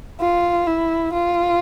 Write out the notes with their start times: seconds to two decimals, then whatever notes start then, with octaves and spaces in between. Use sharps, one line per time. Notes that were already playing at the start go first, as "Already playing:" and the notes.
0.21 F4
0.67 E4
1.13 F4